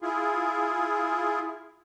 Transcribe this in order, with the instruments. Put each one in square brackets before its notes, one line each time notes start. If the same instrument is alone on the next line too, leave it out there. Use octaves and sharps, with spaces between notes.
[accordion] E4 F4 G#4